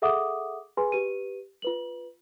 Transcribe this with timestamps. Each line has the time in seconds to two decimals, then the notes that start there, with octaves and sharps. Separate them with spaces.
0.02 G#4 A4 E5 F#5 D6 D#6
0.77 G#4 B4 G#5 C6
0.92 G4 B4 D#7
1.62 F4 B4 F#7